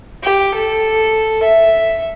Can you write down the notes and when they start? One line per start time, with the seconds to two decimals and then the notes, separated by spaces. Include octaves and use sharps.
0.24 G4
0.54 A4
1.43 E5